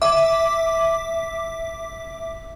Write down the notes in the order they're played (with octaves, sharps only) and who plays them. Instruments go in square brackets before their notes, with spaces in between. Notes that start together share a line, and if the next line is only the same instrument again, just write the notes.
[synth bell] E5 D6